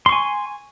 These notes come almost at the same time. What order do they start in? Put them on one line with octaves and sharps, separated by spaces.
C6 C#6 G#5